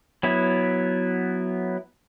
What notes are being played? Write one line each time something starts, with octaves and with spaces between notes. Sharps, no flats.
F#3 B3 E4